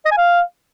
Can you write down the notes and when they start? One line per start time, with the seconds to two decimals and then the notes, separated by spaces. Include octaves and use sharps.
0.05 D#5
0.11 G#5
0.17 F5